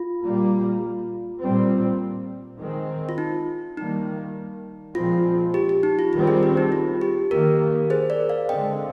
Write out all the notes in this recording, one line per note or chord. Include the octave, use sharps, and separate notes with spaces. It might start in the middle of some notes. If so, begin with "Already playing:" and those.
Already playing: F4
A#2 G3 A#3
A#2 G3 C4
D#3 G#3 C4
F4
D#4
D#3 G3 A#3 D#4
A#2 F3 G#3 C4 F4
G4
G4
D#4
F4
D#3 G3 C4 F4
G#4
G4
D#4
F4
G4
D#3 A#3 G4 A#4
G#4 C5
A#4 D5
D5 F5
D3 G#3 C4 D#5 G5